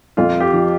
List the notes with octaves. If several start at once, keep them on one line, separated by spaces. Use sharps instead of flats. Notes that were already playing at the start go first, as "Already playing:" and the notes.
F2 F4
G4
F3